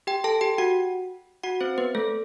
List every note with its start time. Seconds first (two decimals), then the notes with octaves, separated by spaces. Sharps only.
0.07 G4 G5
0.24 A4 A5
0.41 G4 G5
0.58 F#4 F#5
1.43 F#4 F#5
1.61 C4 C5
1.78 B3 B4
1.95 A3 A4